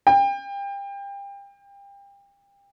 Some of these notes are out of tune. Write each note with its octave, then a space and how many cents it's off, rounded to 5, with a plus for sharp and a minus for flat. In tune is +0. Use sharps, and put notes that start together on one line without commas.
G5 +30